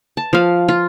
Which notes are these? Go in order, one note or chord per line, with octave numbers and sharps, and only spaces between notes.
A5
F3 F5
F4